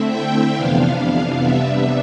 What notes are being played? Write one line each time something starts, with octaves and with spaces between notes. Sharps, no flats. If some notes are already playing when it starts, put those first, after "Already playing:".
Already playing: D3 A3 C4 E4 E5
G5
F2 C3 E3 B3 D4 F5
C3 G3 B3 D4 E5